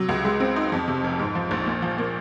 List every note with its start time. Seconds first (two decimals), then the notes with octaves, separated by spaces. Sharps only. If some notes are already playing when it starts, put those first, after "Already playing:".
Already playing: C3 F#3
0.09 C#2
0.24 G#3
0.40 C4
0.56 D#4
0.72 F2
0.88 C3
1.04 F1
1.19 G#2
1.35 F3
1.51 A#1
1.66 A#2
1.82 F3
1.98 A#3